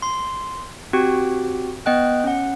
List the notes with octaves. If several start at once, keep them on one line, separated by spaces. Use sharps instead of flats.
C6
C4 F#4 G4 G5
B3 D#5 G5 F#6
C#4 F#5